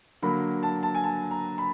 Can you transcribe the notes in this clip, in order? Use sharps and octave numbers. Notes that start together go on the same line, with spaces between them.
D3 F#3 A#3 B5
A5
A5
G#5
A5
A#5
B5